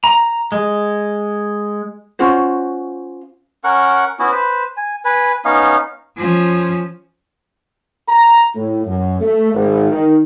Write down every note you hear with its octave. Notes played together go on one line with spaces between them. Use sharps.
A#5
G#3
C#4 F4 F#4 C5
C#4 A#4 F#5 C#6
B3 C#4 E4 F#4
B4 C5
G#5
B4 G#5
B3 C#4 D#4 F5
F3 C#4
A#5
A2
F#2
A3
G#1
D#3